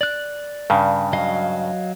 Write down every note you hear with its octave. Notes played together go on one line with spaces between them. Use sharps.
D5 F#6
G2 C#3
F#3 D#5 F5